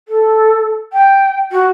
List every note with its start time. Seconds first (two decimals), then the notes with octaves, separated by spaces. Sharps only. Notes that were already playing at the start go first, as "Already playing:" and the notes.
0.08 A4
0.93 G5
1.52 F#4